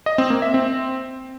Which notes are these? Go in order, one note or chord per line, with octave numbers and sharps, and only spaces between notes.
D#5
C4
A#3
E5
C4